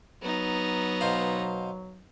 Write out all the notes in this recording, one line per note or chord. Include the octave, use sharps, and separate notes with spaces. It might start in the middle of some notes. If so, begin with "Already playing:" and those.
F#3 B3 D#4
B2 C5 F5